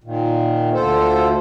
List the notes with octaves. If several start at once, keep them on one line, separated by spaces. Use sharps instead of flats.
A#2 D#3
D2 D3 F4 A4 C5